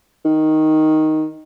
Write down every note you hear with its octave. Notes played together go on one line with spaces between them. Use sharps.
D#3